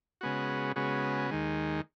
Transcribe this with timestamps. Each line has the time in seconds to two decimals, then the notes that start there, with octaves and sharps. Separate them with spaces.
0.21 C#3 G#3 B3 F#4
0.76 C#3 G#3 B3 F#4
1.31 D#2 D#3 G#3